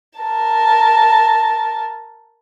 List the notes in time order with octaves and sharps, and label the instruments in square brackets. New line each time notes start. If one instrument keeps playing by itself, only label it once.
[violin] A#4 A5